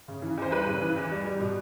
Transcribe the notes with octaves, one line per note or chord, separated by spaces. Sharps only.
C#3
E3
E2 C5
G3 B4
C#3
E3
E2
G3
G3
B2